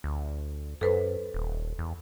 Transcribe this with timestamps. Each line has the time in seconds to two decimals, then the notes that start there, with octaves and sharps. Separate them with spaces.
0.04 D2
0.81 F#2 A4 B4 C5
1.34 D#1
1.79 E2